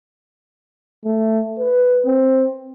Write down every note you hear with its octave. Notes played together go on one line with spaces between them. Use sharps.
A3
B4
C4